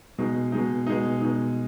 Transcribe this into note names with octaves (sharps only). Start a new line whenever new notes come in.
B2 G#3 D#4
B2 G#3 D#4
B2 G#3 D#4
B2 G#3 D#4